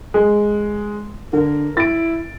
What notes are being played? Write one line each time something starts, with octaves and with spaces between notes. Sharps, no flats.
G#3
D3 A#4
E4 A6 D7